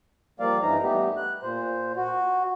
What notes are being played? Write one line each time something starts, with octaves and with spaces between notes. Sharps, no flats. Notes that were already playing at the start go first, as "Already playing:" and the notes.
F3 G3 A#3 D5 F5
G2 E3 D#4 A#5
G3 A3 B3 G4
F#6
A#2 C5
F#4